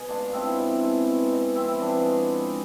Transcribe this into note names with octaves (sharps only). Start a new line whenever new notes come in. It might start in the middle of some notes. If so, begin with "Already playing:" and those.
Already playing: B2 G#4
G#3 D4 F4
B2 C4 E4
B2
G#3
B2
B2
F3 C4 E4
F3 B3 D4
G#3